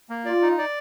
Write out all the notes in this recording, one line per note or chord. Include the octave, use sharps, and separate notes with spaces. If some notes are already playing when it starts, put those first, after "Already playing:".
A#3
F4 D5
D#4
D5